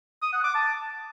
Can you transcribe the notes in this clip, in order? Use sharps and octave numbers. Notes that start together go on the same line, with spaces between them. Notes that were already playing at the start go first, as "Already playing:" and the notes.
D#6
F#5
D6
A5